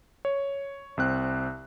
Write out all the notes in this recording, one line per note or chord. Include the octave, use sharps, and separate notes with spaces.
C#5
C2 C4 F#6